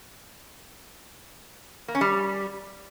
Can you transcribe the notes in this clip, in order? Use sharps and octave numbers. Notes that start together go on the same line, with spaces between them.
A#3
C#4
G3